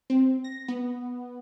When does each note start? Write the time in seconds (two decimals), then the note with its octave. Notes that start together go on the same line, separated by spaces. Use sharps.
0.10 C4
0.44 A#6
0.68 B3